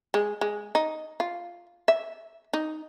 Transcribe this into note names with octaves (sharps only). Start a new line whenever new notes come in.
G#3
G#3
D#4
F4
E5
D#4